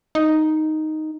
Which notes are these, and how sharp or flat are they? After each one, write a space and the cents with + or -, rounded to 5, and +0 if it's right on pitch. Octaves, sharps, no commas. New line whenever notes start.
D#4 +0